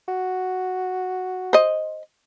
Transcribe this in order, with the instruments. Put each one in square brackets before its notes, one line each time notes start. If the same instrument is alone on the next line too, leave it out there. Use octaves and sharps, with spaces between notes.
[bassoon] F#4
[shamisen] C5 D#5